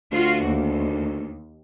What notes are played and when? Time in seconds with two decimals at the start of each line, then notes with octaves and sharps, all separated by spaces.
0.12 D2 F4 F#4
0.45 D#2